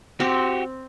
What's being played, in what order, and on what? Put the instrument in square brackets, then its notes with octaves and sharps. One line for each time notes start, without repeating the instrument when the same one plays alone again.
[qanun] C4 [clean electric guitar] F#4 G4